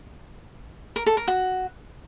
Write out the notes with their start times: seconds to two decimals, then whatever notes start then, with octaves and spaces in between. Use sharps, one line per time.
0.96 A#4
1.06 A4
1.17 A#4
1.28 F#4